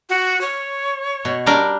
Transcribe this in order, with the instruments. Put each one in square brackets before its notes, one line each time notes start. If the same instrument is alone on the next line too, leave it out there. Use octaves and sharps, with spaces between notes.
[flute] F#4
C#5
[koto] B2
G3 D4 A#4